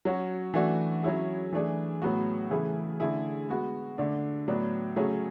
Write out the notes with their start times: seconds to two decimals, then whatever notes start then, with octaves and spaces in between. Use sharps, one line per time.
0.05 F#3 C#4 F#4
0.54 E3 A3 D4 F#4
1.03 F#3 C#4 E4 G#4
1.53 E3 A3 D4 G#4
2.02 A2 F#3 B3 F#4
2.50 C#3 E3 A3 E4 G#4
3.00 D3 A3 E4 G#4
3.49 G#3 B3 F#4
3.98 D3 A3 D4
4.48 A2 F#3 B3 D4
4.96 C#3 F#3 A3 C#4 G#4